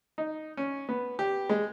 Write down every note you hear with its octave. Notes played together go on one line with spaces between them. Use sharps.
D#4
C#4
B3
G4
G#3